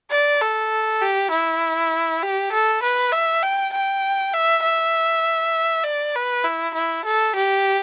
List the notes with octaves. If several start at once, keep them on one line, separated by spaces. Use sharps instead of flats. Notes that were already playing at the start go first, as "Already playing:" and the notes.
D5
A4
G4
E4
G4
A4
B4
E5
G5
G5
E5
E5
D5
B4
E4
E4
A4
G4